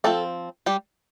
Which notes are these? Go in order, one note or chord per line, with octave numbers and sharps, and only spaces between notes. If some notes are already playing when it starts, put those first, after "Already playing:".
F3 A3 C4 A4
G3 G4